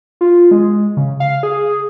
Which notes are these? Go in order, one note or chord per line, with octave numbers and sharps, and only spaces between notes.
F4
G#3
C#3
F5
G#4